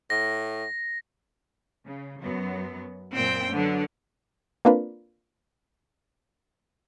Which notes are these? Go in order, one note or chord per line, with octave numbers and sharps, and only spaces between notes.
A2 A#6
C#3
F#2 F#3 B3
F#2 A#2 C4 G5
D3 F#3 B3 D4
A#3 C4 D4 F4 A#4 B4